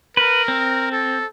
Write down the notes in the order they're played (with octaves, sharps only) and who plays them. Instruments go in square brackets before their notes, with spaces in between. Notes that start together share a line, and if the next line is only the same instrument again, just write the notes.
[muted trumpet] A#4 [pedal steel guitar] B4
[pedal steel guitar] C4
[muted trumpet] A4